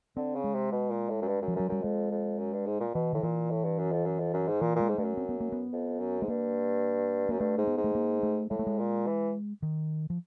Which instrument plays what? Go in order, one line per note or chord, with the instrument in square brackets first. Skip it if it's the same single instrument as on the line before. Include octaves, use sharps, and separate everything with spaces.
[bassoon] D3 [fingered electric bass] C4
[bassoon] C#3
[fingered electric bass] G#3
[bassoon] C3
B2
A#2
A2
F#2
G2
F#2
[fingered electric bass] F3
[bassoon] F#2 [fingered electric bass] F#3
[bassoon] F#2 [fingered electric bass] G3
[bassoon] F2 [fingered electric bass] G#3
[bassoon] F2
F#2
G2
G#2
A#2
[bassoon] B2 [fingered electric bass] E3
[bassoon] A2 [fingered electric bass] D#3
[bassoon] A#2 [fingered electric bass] E3
[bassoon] A2
G2
F#2
F2
F#2
F2
F#2
G#2
[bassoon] A#2 [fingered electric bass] E3
[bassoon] A#2 [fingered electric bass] G#3
[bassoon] G#2
[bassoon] G2 [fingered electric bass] A3
[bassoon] F#2
[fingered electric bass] C4
B3
A#3
B3
[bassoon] F2
F#2
[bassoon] G#2 [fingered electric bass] A3
[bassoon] G2 [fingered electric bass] A#3
[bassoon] F#2 [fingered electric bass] A#3
[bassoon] G2 [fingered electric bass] A3
[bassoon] G#2
[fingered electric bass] B3
[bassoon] G#2
[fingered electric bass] A3
A#3
A3
[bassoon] A2 [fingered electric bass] G#3
[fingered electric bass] A3
G#3
[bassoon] A#2
E3
[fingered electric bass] D#3
F3